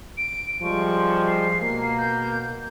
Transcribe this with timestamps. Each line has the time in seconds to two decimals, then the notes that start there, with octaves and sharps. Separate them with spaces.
0.17 D7
0.63 F3 G3 G#3 C#6
1.28 C7
1.61 B2 A#3
1.98 G6